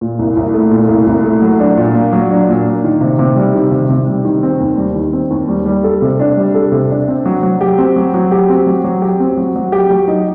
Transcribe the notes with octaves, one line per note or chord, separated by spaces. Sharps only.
A#2
C2
C2
A3
A#2
C2
C2
A3
F#3
D4
A#2
A#3
F#3
D4
A#2
A#3
D#3
C3
C3
G3
D#3
C3
C3
G3
D#3
C4
D#2
G3
D#3
C4
D#2
G3
G3
A4
C3
D4
G3
A4
C3
D4
C4
F#3
F#3
G4
C4
F#3
F#3
G4
C4
F#3
F#3
G4
C4
F#3
F#3
G4
F#3
D#4